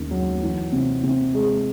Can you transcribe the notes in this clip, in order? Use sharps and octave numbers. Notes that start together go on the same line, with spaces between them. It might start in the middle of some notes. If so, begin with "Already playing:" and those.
Already playing: D#2 C#3 A#3
F#3
E3
C3
C3
G#3